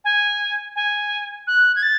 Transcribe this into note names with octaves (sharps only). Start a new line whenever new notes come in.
G#5
G#5
F#6
G#6
A6